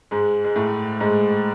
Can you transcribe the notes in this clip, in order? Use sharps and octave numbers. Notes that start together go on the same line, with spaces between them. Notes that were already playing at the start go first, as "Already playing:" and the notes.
G#2 G#3
G#3
A2 A3
G#2 G#3